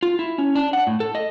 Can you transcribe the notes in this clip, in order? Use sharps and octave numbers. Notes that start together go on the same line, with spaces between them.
F4
E4
C#4
D4
F#5
A2
A4
D#5